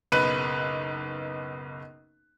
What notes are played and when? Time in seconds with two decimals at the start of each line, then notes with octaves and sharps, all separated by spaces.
0.12 F#1 B1 B3 B4 F#6 D#7